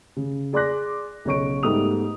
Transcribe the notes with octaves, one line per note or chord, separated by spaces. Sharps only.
C#3
G#4 D5 C6 D6 F#6 A#6
B1 C#3 C#5 C#6 D7
G#2 G3 A3 B3 D#6 F7